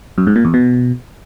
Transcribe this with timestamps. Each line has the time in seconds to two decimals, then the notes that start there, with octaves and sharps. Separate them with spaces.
0.18 F#2
0.27 G#2
0.36 A#2
0.45 E2
0.54 B2